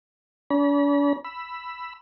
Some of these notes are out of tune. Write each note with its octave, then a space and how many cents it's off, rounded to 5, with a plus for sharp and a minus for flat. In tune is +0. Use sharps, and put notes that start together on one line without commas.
D4 -45 B5 -40
B5 +0 E6 +10